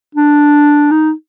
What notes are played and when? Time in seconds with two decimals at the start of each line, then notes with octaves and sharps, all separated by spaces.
0.15 D4
0.91 D#4